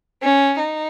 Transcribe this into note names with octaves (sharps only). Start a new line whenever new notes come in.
C#4
D#4